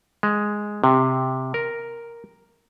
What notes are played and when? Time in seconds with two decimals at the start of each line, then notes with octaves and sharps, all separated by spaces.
0.23 G#3
0.84 C3
1.54 A#4